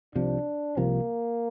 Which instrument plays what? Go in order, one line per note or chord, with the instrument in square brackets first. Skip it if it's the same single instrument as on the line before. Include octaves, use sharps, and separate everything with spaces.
[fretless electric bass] C2 C3 F3 [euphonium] D4
[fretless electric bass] C2 C3 F3 [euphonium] A#3